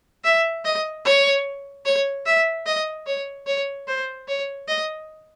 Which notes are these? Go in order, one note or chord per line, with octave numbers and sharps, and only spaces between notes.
E5
D#5
C#5
C#5
E5
D#5
C#5
C#5
C5
C#5
D#5